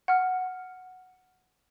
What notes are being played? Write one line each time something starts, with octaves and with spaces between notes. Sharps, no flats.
F#5 F6